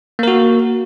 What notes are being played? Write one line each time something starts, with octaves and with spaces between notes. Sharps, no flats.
A#3 F#4 A#4